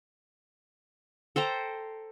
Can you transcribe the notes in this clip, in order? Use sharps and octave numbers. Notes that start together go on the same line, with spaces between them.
A4 C5 G5 A#5